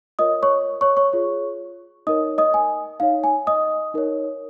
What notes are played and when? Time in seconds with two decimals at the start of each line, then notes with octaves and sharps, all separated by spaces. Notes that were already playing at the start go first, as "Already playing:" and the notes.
0.19 F4 A#4 C#5 D#5 D#6
0.43 C#5 C#6
0.81 C#5 C#6
0.97 C#5 C#6
1.13 F4 G#4 C#5
2.07 D#4 A#4 C#5 D#5 D#6
2.38 D#5 D#6
2.54 G#5
3.00 D#4 C#5 F5
3.24 G#5
3.47 D#5 D#6
3.94 D#4 A#4 C#5